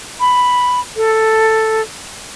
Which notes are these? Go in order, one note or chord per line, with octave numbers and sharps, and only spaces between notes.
B5
A4